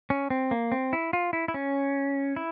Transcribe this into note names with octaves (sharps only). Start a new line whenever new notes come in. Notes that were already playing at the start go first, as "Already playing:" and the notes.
C#4
C4
A#3
C4
E4
F4
E4
E4
C#4
E4